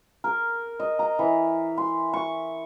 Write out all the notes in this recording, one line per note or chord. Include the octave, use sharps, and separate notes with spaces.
A#4
D#5
A#5
E3
C6
C#6